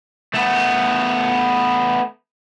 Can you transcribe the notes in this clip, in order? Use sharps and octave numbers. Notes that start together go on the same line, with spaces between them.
A3 B3